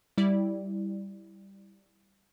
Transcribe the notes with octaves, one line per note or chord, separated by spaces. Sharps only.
G3 E4 D5